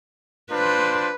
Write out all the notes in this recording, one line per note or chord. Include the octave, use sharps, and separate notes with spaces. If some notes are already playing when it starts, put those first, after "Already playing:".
D4 F4 B4 C5